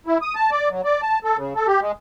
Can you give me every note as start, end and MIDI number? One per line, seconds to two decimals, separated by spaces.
0.07 0.18 64
0.22 0.35 87
0.35 0.50 81
0.51 0.69 74
0.70 0.81 54
0.84 1.01 74
1.02 1.19 81
1.24 1.37 69
1.37 1.53 49
1.56 1.67 69
1.67 1.80 67
1.81 1.92 56